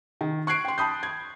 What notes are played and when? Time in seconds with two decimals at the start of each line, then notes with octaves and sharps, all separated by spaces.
0.21 D#3
0.47 C#6 F#6 G#6 C7 D7
0.65 G5 C6
0.78 A5 B5 D#6 G6
1.03 G#6